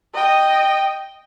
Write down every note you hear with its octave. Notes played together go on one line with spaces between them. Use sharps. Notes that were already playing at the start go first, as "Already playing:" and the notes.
D#5 G5